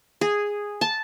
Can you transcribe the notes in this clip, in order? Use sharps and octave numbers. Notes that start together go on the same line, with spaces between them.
G#4
A5